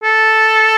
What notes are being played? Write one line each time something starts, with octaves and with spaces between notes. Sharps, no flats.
A4